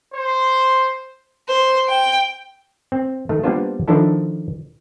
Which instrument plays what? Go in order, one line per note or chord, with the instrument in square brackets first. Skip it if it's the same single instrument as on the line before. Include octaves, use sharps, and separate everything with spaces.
[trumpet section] C5
[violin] C5
G5
[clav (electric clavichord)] C4
D#3 A3
G3 A#3 B3 D4 F4 C5
D3 D#3 F3 D4 E4 A4